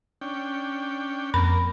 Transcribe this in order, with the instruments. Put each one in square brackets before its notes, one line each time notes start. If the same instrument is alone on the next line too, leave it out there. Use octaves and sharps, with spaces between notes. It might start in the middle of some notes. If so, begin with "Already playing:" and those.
[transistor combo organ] C#4 D4 G5
[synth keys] F2 [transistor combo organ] A#3 A#4 [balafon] B5